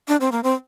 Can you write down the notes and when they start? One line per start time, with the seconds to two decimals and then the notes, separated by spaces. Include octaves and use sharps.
0.08 D4
0.20 C4
0.32 A#3
0.44 C4